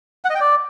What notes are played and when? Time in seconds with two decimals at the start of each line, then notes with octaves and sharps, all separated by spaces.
0.25 F#5
0.30 D#5
0.35 G5
0.40 D5